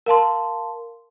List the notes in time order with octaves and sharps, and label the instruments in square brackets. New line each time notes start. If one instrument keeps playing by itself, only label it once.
[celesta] A#4 F5 A5 C6